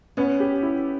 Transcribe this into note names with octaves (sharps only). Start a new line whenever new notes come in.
B3 C#4
G4
E4